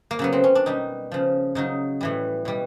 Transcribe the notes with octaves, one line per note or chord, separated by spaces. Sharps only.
A#3
C#3 F#3 B3
C4
C#4
D4
B2 G3 D#4
C#3 F3
C#3 F#3 D#4
A2 E3 G3
B2 G3